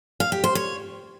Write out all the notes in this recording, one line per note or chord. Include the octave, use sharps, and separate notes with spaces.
F5
G4
C5
C#5